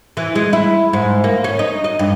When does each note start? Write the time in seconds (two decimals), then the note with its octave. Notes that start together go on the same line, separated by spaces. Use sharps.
0.17 E3
0.35 G#3
0.53 E4
0.93 G#2
1.24 A#3
1.44 C#4
1.59 D#4
1.84 D#5
1.99 G2